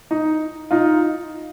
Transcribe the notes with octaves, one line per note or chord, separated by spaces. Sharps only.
D#4
D#4 F4